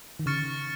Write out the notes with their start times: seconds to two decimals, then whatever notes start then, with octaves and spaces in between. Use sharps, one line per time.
0.19 D#3
0.26 C#3 C#6 F6 A6 C#7